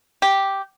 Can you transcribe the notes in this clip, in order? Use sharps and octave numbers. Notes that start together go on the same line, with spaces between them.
G4